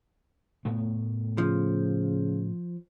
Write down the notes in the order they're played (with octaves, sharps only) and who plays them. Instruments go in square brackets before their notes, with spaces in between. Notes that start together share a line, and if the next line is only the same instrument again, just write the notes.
[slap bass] A2 A3 B3
[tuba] C#3 [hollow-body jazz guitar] F3